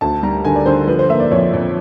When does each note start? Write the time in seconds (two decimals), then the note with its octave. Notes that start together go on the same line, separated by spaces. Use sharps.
0.01 D2 A5
0.23 G3 A#5
0.45 D3 G#5
0.56 D5
0.66 D3 C5
0.87 F3 B4
0.99 C5
1.09 A#3 E5
1.20 D5
1.31 F2 C#5
1.53 F2